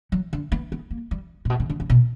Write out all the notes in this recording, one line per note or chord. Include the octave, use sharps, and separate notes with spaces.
F#3
D3
B3
B3
A#3
G3
A#2
B2
C#3
D3
C#3
B2